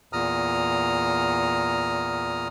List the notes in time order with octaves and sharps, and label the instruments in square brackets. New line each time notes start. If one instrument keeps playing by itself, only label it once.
[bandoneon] E2 A#2 A#5 D#6 F6